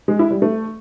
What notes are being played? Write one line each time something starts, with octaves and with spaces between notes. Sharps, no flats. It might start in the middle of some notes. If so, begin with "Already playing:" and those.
G#3
E4
G3
A3